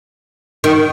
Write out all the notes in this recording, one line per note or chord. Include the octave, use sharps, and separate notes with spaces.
D#3